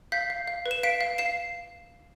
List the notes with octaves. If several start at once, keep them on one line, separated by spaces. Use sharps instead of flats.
F5 G6 B6
F5
F5
B4
E7
F5 B6 D7
F5
F5 C7 E7